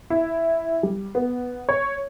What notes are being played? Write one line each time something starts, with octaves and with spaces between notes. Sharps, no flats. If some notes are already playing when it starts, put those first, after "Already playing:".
E4
G3
B3
C#5